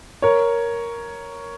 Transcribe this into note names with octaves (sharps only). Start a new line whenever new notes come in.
A#4 C#5